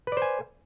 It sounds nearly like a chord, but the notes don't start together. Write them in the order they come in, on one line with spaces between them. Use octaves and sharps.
B4 D5 C5 G#5